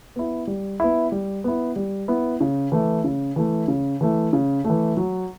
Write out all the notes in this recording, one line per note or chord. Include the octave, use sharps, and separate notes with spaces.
B3 E4
G3
B3 E4
G3
B3 E4
G3
B3 E4
C#3
E3 A3
C#3
E3 A3
C#3
E3 A3
C#3
A3
E3
F#3